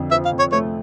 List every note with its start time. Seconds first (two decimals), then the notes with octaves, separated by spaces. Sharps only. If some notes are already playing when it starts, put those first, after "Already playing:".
Already playing: F2 D3
0.11 F3 E5
0.25 F5
0.32 F2
0.39 C#5
0.52 A3 C#5